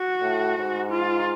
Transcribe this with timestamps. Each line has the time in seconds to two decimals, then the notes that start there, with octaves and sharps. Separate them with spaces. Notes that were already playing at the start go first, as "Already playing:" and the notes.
Already playing: F#4
0.21 A2
0.57 G#2
0.91 F4